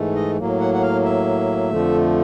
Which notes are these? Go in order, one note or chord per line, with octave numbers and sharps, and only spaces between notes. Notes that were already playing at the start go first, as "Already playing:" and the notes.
Already playing: G#2 E3 A3
D#5
A2 F#3 A#3
F#5
F#5
F5
E5
F2 D3 F3 A3